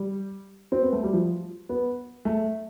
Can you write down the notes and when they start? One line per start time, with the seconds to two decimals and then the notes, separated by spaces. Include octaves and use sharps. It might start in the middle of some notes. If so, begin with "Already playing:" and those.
Already playing: G3
0.72 C4
0.83 B3
0.93 A3
1.03 G3
1.13 F3
1.69 B3
2.25 A3